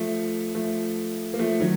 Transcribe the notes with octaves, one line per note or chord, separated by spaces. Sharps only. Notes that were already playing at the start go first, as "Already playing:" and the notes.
Already playing: F3 A3
F3 A3
A#3
F3 A3
D#3 F#3